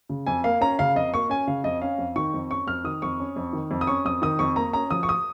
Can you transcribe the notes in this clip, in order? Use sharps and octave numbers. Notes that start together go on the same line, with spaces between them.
C#3
F2 G#5
A#3 F5
C#4 A#5
C#3 F5
F2 D#5
A#3 C#6
C#4 G#5
C#3 F5
F2 D#5
C#4 F5
F2
D#3 C#6
F2
C#4 C#6
F2 F6
D#3 D#6
F2 C#6
C#4
F2
D#3
F2
D#6
C#4 C#6
F2 D#6
D#3 D#6
F2 C#6
A#3 A#5
C#4 A#5
F3 D#6
C#6
D#6